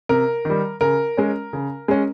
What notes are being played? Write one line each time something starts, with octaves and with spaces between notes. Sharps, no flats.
C3 A#4
D#3 G3
C#3 A#4
G#3 C#4
C#3
G#3 C#4